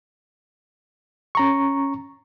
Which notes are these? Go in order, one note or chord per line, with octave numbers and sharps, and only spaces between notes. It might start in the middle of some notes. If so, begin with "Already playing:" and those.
C#4 A#5 C#6